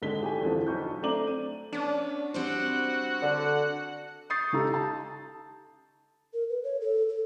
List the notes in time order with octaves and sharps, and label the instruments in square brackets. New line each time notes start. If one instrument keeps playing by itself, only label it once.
[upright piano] G#1 D#2 D3 G#3 B6 G7
G4 A4 G#5
E2 D3 F3
B1 C#6 G6
A3 C4 D4 A#5 D6 F#7
D#7
[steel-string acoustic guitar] B3 C#4 [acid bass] D4
[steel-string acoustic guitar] G3 C4 C5 [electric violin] F#4 F#5
[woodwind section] D3
[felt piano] C#6 D#6 G6 A6 C7
C#3 D#4 G4 A4
A5
[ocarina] A#4
B4
C#5
A4
A4